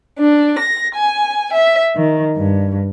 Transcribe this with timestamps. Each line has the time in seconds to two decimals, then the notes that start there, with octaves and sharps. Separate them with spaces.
0.19 D4
0.60 A#6
0.97 G#5
1.53 E5
1.96 D#3
2.38 G2